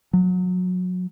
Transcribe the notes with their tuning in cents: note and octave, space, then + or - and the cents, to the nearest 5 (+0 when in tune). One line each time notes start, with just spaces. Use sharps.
F#3 -25